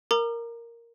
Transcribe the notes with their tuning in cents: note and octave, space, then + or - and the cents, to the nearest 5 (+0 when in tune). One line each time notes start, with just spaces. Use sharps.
A#4 +0 A#5 +0 D6 +40